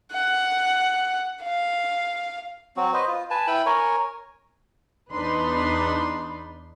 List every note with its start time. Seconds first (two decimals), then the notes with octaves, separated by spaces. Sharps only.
0.12 F#5
1.43 F5
2.77 F#3 C4 F#4
2.93 B4 C5 D#5
3.08 F4
3.30 B4 G#5 A5
3.47 E4 B4 G5 B5
3.66 A#4 C#5 G#5
5.12 E2 D4 D#4 B4 B5 C6